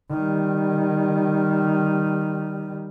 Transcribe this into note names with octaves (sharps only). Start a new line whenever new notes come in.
D#3 G3